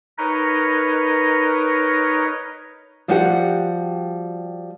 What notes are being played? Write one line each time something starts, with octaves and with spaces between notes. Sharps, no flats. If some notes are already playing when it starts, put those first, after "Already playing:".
D#4 A#4 B4 C#5 D#5
F3 G3 F#4 G4 D#5 F#5